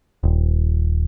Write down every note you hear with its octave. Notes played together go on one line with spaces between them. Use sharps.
D#1